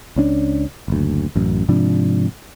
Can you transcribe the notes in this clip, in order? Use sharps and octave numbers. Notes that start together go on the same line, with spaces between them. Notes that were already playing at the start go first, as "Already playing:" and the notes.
C#2 C#4 D4
F#1 D2
A1 F#2
G#2 C3 F3 D4